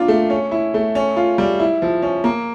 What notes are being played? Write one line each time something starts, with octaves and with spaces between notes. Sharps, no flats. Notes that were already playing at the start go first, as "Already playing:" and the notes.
Already playing: A#3 D4 F4
A3
C#4
E4
A3
C#4
F4
G3
E4
F3
C#4
A#3